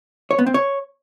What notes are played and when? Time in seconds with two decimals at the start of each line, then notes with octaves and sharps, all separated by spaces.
0.31 C#5
0.39 B3
0.46 C4
0.54 C#5